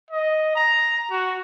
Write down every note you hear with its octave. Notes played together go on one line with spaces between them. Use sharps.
D#5
A#5
F#4